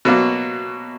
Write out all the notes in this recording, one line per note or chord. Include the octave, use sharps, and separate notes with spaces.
B2 F#3 A#3